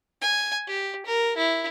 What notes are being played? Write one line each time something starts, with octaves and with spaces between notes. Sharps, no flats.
G#5
G4
A#4
E4